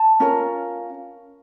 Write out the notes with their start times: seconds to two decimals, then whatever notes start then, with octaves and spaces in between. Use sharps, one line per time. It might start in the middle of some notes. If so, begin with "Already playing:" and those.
Already playing: A5
0.20 C#4 F4 A#4